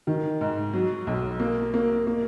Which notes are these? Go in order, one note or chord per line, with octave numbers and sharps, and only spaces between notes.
D#3
G#2
F#3
B1
A#3
A#3
A#3